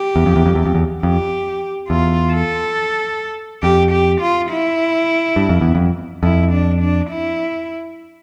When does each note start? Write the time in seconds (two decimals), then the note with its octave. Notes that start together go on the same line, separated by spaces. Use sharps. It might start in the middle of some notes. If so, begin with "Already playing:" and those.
Already playing: G4
0.16 E2
0.26 F2
0.36 E2
0.46 F2
0.55 E2
0.66 F2
0.75 E2
1.03 F2 G4
1.89 E2 F4
2.32 A4
3.63 F2 G4
3.91 G4
4.21 F4
4.49 E4
5.36 G2
5.49 F2
5.61 E2
5.75 F2
6.23 F2 E4
6.52 D4
6.81 D4
7.10 E4